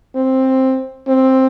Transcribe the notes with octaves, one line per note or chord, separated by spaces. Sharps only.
C4
C4